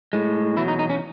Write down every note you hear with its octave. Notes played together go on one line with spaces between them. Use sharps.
A2 G#3
E2 B2 F#3 E4
D#4
D#4
C#4